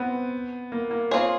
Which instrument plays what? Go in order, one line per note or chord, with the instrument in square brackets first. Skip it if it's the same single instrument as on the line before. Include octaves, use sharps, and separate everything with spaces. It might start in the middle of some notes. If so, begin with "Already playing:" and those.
Already playing: [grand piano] B3 C4
A#3
A#3
[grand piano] A#3 [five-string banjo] C4 F4 G#4 C#5